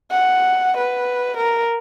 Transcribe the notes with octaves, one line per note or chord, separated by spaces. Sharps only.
F#5
B4
A#4